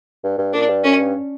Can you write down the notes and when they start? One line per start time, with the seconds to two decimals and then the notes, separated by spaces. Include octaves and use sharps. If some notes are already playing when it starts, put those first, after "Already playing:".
0.23 G2
0.38 G2
0.53 A#2 D4
0.68 G2
0.84 F#2 C#4
1.00 G2